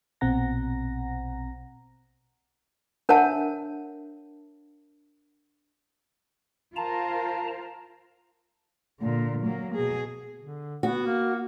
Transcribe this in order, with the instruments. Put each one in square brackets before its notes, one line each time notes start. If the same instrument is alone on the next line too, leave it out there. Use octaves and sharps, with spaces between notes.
[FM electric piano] A#1 B2 C4 F#5 A#5 A#6
[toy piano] D4 A#4 C#5 E5 F#5 A5
[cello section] F4 A#4 C5 [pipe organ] A5 A#5
[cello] A#2 D3
F#3 A#3
B2 G#4
[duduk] D3
[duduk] B3 [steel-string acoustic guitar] F#4
[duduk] A#3